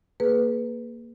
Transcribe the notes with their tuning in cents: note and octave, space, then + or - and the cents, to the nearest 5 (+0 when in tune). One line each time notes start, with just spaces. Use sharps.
A#3 +0 G#4 +25 B4 +0